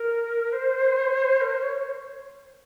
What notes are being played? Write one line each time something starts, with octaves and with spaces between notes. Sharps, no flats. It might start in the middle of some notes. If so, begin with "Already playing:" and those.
Already playing: A#4
C5
A#4
C5
C#5